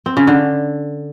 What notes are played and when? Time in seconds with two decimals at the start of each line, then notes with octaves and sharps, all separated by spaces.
0.06 C4
0.17 C#3
0.27 D3